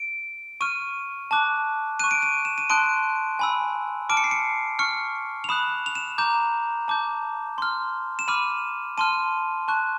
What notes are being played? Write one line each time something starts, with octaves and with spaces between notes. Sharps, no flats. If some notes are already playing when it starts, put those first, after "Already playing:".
Already playing: D7
C#6 F6 D#7
A5 D6 F#6
C#6 F#6 D#7
D7
D#7
E7
D#7
A5 C6 D#6 F#6 D7
G#5 B5 E6
A5 D6 F6 D7
C#7
C7
C#7
C#6 F6 C#7
F7
B5 D#6 F#6 E7
F7
E7
A#5 D6 G6 E7
A5 D6 G6
C6 F6
E7
B5 D6 F6 D#7
A5 C6 F6 D#7
A5 C#6 F#6